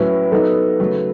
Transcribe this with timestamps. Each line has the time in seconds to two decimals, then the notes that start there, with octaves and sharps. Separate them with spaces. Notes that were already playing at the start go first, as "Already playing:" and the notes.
Already playing: A2 F#3 C#4 E4 B4
0.32 F#3 B3 D#4 A4
0.80 C#3 F#3 A3